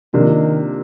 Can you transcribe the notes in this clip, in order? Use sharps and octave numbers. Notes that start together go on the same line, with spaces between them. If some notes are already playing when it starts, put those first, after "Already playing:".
C3 D#3 F3 A#3 D4